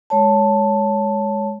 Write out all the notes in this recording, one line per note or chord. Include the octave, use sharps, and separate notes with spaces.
G#3 C#5 A5